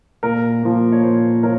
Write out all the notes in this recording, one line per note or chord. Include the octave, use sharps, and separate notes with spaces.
A#2 A#4
F3 A#3
C#5
A#2 C5
F3 A#4 C#5